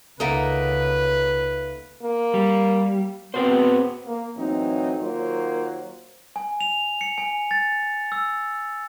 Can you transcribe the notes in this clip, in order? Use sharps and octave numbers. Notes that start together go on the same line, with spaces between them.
C#2 C#3 A#3 D#4 A4 B4 E5 F#5
A#3
G3
B3 C4 F#4 C5
A#3
A2 E3 F#3 C4 D#4
D#3 F#3 A#3 F4 C5
G#5
F7
C#7
G#5
A6
E6